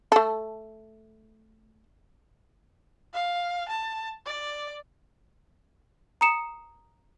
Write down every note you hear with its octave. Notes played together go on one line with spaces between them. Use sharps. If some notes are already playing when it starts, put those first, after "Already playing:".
A3 A4
F5
A5
D5
A#5 D#6 C#7 E7